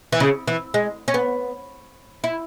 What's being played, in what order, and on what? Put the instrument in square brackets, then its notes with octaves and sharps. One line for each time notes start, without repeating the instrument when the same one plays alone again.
[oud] E3
C#3
E3
G#3
C#4
B3
E4